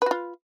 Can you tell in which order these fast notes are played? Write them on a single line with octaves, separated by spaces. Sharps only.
B4 F#4 F4